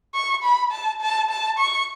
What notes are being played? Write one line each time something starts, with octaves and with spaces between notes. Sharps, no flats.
C#6
B5
A5
A5
A5
C#6